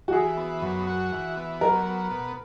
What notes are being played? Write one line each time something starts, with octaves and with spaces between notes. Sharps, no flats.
F#4
E3 G#4
B3
F#2
F#4
E3
B3
F#3 A#4
B3
B2